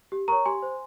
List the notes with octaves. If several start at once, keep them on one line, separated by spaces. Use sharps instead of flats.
G4
A#4 C#5 A#5 C#6
G4 G#5 C6
C5